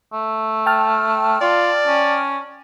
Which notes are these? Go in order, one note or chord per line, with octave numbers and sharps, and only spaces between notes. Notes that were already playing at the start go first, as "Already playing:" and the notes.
A3
G5 A5 F6
F4 D5
C#4